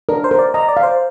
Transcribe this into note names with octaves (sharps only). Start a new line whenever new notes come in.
D4 A#4
C5
A#4
D5
D#5 A#5
D5
F5
C5